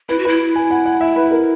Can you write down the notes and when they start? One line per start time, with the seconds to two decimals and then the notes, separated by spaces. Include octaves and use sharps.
0.09 E4 B4
0.19 F#4
0.25 E4 B4
0.56 G#5
0.71 F#5
0.86 F#5
1.01 E5
1.16 B4
1.31 A#4